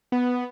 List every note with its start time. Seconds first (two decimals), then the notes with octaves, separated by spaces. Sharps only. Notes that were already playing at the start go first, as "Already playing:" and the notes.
0.12 B3